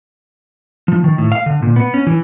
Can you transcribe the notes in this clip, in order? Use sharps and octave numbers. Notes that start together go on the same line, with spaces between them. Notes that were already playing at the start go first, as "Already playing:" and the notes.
F3
D#3
A2
F5
D3
A#2
B3
C#4
E3